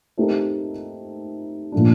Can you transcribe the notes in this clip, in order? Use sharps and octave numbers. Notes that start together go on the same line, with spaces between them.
A3 C4 D#4 G4 A#4
A#2 F3 A3 D4